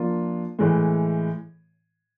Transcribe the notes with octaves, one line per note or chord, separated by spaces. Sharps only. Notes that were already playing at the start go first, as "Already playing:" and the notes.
Already playing: F3 A#3 D4 F4
A2 E3 G#3